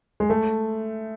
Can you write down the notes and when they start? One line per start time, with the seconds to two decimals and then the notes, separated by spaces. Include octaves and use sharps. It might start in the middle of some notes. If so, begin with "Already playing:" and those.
0.20 G#3
0.30 A3